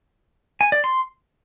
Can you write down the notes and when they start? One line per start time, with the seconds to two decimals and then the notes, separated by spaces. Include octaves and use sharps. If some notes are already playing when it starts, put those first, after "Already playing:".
0.61 G#5
0.72 D5
0.84 C6